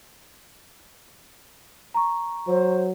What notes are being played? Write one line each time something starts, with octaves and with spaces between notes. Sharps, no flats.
A#5 C#6
F#3 C5